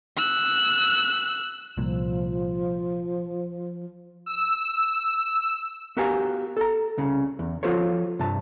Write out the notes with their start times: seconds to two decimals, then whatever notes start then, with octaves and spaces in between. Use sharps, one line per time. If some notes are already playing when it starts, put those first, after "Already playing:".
0.17 E6 F#6
1.77 C2 A#2 F3
4.26 E6
5.97 B3 F#4 G4 A#4 F5 G#5
6.57 A4 A#5
6.97 C2 C#3
7.39 E2
7.63 F3 F4 F#4 A4 C5 C#5
8.19 G2 C3 A5